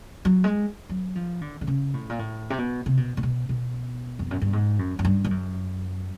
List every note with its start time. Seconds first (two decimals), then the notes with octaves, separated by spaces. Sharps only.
0.25 F#3
0.44 G#3
0.89 F#3
1.16 F3
1.41 D3
1.61 D3
1.67 C#3
1.94 A2
2.10 A#2
2.19 A2
2.50 C3
2.58 B2
2.86 C3
2.97 B2
3.17 A#2
3.23 B2
3.49 B2
4.19 F2
4.31 F#2
4.42 G2
4.53 G#2
4.79 F#2
4.99 F#2
5.05 G2
5.24 G2
5.31 F#2